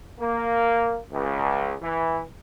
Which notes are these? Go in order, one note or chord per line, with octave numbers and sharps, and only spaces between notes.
A#3
C#2
E3